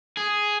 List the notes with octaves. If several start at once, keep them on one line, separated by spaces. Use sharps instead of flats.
G#4